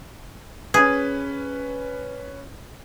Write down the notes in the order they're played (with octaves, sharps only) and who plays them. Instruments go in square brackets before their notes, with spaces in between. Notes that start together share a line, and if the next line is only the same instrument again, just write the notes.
[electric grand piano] C#4 B4 [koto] G#4